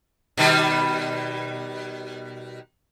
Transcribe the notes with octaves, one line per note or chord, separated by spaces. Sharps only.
B2 D#3 G3